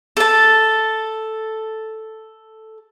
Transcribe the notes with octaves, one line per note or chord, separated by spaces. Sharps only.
A4 A5